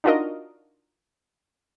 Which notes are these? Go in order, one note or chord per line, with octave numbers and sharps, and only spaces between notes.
D4 D#4 F4 F#4 A#4 D#5